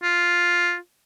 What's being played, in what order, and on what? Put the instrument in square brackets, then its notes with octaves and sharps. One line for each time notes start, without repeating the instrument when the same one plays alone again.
[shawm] F4